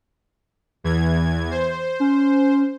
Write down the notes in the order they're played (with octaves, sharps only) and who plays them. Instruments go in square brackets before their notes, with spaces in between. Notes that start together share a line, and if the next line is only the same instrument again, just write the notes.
[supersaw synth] E2 E3 G#6
C5
[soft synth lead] C#4